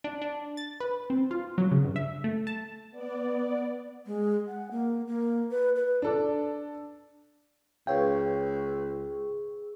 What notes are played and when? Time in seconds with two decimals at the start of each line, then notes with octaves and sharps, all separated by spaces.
0.04 D4
0.22 D4
0.57 A6
0.80 B4
1.10 C4
1.31 F4
1.58 F#3
1.71 C#3
1.84 G2
1.96 E5
2.24 A3
2.47 A5
2.91 B3 D5
4.06 G#3
4.48 F#5
4.71 A#3
5.07 A#3
5.51 B4
5.76 B4
6.02 D4 A4 D5
7.87 C#2 G#4 B4 C#5 F5 G5 C#6 E6